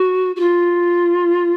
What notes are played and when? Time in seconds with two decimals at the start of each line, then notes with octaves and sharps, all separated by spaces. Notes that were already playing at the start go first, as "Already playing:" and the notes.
Already playing: F#4
0.35 F#4
0.39 F4